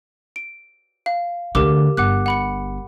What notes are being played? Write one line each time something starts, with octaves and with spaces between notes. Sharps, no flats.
D7
F5
D2 D3 G4 A#4 D6
G1 F#5 D6 F#6
F#5 B5 C#7